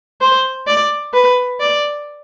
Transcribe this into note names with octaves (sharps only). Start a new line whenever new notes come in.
C5
D5
B4
D5